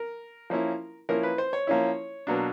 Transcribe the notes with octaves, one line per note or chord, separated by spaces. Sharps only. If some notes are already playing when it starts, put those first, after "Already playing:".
Already playing: A#4
F3 A#3 C#4 E4
F3 A#3 C#4 E4 A#4
B4
C5
C#5
F3 A#3 C#4 E4
B2 F#3 A#3 D4